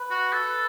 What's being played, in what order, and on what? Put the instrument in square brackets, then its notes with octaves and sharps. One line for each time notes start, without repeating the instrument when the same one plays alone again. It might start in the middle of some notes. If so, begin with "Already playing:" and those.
Already playing: [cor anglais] B4
[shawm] F#4
A4